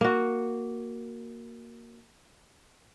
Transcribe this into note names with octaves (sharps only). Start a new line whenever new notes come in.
A#3 F#4